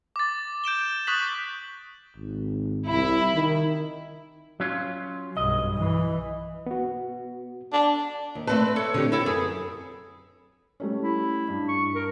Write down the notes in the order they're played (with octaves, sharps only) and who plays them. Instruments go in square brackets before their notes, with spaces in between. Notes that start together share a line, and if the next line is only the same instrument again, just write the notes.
[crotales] D6 A6
G6 D7 E7 G7
C#6 D#6 F#6 A6 B6 F#7
[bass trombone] G#1
[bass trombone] C2 [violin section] E4
[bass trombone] D#3
[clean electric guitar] F#3 C#4 F4
[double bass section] B1 G2 [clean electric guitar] D#5
[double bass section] E3
[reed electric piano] B3 F#4
[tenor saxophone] D4
[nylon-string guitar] D#2
[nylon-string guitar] A3 D5 A5 [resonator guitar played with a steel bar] C4 B4
[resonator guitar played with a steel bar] A4 C#5
[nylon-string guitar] D3 C4 G4
[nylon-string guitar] C4 C#5 [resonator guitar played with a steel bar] E4 A4 G5
[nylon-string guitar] F#2 B4 [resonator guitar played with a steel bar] G#4
[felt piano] G3 A3 C#4
[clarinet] E4
[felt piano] G2
[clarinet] C#6
A#4